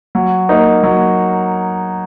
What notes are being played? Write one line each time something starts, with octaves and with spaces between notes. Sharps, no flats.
F#3
A#3 D#4
F#3